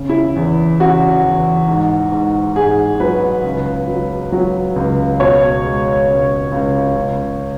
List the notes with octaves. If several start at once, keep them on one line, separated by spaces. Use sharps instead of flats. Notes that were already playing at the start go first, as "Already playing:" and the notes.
Already playing: C#3
E4
E2
C#3 F#4
E2
G#2
G#2
G#2 G#4
F#3 B4
C#2
F#3
F#3
C#2
B2 C#5
G#3
C#2
C#2
C#2